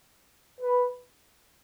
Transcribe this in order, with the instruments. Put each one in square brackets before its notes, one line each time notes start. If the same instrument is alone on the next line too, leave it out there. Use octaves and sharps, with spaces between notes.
[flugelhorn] B4